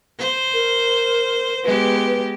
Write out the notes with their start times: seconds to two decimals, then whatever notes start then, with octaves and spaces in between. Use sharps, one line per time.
0.19 C5
0.54 A#4
1.64 G#3 B3 G4 B4